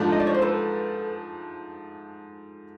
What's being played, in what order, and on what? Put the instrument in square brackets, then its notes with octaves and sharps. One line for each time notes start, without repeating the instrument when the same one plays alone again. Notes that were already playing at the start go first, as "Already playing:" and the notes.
Already playing: [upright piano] G#2 F3 A3 D4
[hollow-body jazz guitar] D#5
D5
C#5
C5
A4 B4